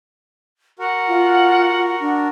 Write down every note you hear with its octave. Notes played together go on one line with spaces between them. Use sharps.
F#4 A#4 F#5
F4
D4